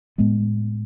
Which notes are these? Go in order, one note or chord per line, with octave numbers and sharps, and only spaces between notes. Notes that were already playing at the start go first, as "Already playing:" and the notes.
A2 G#3 B3